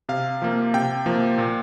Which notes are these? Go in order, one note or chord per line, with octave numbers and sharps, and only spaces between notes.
C3 F5
F3 A#3
C3 G5
F3 A#3
A#2